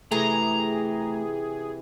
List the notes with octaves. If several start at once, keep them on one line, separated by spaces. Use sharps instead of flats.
C3 E3 A3 G4 G#4 A#5